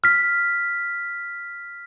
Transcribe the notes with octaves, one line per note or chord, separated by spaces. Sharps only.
F6 B6